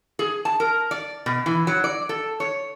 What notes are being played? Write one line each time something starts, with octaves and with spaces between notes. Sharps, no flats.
G#4
A5
A#4
D5
B2
E3
F#3
D5
A4
C#5